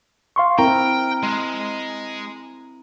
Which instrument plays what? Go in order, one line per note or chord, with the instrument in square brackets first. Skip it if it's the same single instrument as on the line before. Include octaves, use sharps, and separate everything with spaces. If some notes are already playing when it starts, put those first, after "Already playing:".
[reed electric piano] F5 C6 C#6
[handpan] C4 E4 A#4 [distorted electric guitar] G5 [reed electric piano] A#5
[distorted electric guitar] G#3